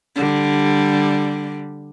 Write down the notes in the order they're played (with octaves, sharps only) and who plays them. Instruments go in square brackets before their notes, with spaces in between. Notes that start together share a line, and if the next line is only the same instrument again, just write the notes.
[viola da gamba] D3 G3